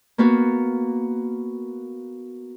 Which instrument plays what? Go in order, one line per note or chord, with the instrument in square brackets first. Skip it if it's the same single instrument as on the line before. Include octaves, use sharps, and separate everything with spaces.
[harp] A#3 B3 F#4